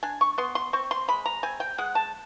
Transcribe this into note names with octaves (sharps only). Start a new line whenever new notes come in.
D4 G#5
C#6
B3 C6
C6
C4 C#6
C6
G#3 B5
A#5
C4 G#5
G5
G#3 F#5
A5